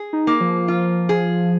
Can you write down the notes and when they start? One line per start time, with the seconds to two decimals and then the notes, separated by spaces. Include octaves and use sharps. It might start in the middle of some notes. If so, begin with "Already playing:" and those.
Already playing: G#4
0.13 D#4
0.27 A#3
0.41 F3
0.68 F4
1.09 G#4